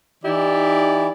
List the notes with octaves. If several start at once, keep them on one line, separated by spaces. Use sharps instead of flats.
E3 D#4 E4 G4 D5